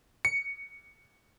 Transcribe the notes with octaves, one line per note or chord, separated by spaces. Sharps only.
C#7